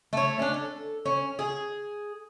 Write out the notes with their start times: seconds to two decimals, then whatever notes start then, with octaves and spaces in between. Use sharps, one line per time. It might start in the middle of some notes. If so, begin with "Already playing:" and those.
0.13 A3 C#5
0.39 C#4 D4
0.54 A4
1.06 C#4
1.39 G#4